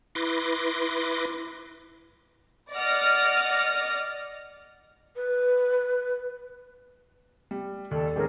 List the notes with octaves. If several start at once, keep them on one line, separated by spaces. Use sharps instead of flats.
E4 B4 C6 D6 A#6
D5 D#5 F#5 F6 A#6
B4
G3
D#2 A4 D5
A1 D#3 G#3 C#4 G#4 A#4